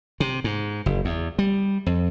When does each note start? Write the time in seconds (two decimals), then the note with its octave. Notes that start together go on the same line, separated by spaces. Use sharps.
0.20 C3
0.44 G#2
0.86 F#1
1.05 E2
1.39 G3
1.86 F2